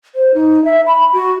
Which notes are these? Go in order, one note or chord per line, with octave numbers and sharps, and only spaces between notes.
C5
D#4
E5
B5
F#4